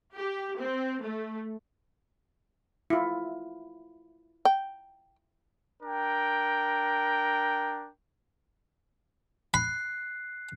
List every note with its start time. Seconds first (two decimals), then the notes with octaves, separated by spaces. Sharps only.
0.14 G4
0.58 C4
1.01 A3
2.90 E4 F4
4.45 G5
5.83 D4 A#4 G5
9.54 B5 F#6 C7